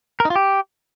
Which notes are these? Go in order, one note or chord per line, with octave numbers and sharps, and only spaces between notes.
A#4
D#4
F4
G4